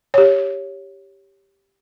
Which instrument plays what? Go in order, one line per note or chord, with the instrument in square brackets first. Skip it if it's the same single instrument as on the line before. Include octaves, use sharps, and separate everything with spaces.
[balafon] G4 C#5